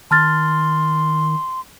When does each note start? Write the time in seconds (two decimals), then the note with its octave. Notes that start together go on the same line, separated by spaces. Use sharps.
0.11 D#3 A5 C6 F6 A6